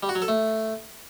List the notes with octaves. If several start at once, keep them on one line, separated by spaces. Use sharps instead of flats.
G3
F#4
F#3
A4
A3